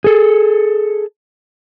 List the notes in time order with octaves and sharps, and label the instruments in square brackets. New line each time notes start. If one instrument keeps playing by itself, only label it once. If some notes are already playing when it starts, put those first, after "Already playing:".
[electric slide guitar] G#4 A4